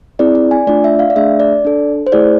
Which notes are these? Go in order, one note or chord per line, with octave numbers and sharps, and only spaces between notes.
C4 E4 G#4 D5
D5
G#5
A3 D4 F4 D5
E5
F5
D5
A3 D4 G#4 E5
D5
D4 A4
C5
A3 E4 G#4 D5